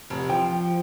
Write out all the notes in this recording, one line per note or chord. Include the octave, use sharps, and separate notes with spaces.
F1
F3 G5